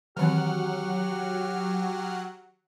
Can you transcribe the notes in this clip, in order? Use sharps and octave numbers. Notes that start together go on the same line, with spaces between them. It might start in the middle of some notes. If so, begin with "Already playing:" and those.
D#3 E3 F#3 C4 G4 F#5 F6